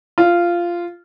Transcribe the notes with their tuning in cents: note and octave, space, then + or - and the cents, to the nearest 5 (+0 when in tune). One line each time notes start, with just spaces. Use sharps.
F4 -10